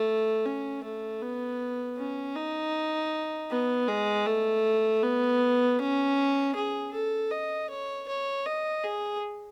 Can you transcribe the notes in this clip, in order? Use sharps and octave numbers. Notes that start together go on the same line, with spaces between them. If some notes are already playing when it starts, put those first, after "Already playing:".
Already playing: A3
C#4
A3
B3
C#4
D#4
B3
G#3
A3
B3
C#4
G#4
A4
D#5
C#5
C#5
D#5
G#4